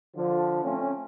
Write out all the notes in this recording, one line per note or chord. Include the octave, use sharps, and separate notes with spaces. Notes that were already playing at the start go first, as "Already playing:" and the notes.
D3 F3
A3 C4 C#4